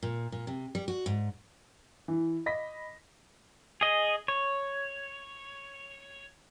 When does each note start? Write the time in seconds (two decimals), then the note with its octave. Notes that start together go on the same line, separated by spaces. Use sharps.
0.03 A#2
0.32 A#2
0.47 C3
0.75 G3
0.88 F#4
1.06 G#2
2.08 E3
2.46 D#5 B5 A#6 B6
3.81 G#4 D#5
4.28 C#5